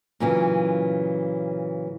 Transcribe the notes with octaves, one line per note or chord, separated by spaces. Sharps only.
A#2 C#3 E3 F#3